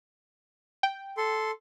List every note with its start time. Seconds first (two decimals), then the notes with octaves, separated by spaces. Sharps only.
0.83 G5
1.17 A4 C6